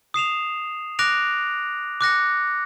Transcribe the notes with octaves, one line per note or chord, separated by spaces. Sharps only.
D#6 C7 E7 F7
D6 F#6 A#6 D7 F7
D6 F#6 A#6 C#7